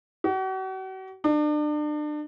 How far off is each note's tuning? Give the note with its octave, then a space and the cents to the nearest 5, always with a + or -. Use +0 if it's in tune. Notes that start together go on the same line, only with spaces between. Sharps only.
F#4 +40
D4 +35